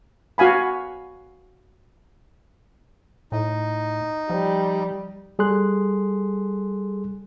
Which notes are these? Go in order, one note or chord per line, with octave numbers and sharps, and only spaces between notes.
F#4 F5 G#5 B5
A2 D#4
F3 G3
G3 G#4 A4 C6 F#6